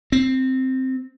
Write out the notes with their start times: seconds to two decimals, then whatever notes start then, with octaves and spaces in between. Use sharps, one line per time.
0.12 C4